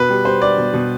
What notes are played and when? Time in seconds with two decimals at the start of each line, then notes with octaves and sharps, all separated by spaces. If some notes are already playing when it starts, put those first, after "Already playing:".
Already playing: B2 B4
0.10 G3
0.25 G3 C5
0.41 G3 D5
0.58 B2
0.74 B2